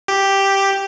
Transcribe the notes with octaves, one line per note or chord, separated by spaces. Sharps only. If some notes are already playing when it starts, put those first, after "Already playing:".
G4